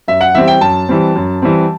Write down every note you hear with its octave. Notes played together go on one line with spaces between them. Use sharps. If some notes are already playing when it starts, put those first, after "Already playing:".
F#2 E5
F#5
E3 G3 C4 E5
G5
F#2 A5
E3 G3 C4
F#2
E3 G3 C4